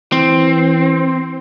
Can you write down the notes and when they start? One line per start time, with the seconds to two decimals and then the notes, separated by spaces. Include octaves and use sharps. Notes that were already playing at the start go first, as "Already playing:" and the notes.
0.12 E3 C4